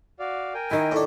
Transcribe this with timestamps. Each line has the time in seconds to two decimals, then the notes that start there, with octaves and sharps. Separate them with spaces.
0.19 F#4 D5 F5
0.54 A#4 G5 G#5
0.71 D#3 E4 D#5
0.92 A2 D4